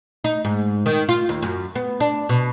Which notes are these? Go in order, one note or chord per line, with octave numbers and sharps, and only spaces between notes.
D#4
G#2
D#3
F4
D#2
F#2
B3
D4
B2